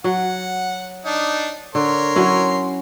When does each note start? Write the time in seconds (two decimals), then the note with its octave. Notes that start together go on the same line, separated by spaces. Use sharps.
0.04 F#3 F#5
1.05 D4 D#4
1.75 D3 A#4 C#5 C6
2.16 F#3 C#4 E4